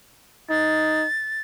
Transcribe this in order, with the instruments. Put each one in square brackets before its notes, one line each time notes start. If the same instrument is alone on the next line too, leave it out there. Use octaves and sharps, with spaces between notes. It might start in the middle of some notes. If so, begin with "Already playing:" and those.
[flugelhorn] D#4 [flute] A6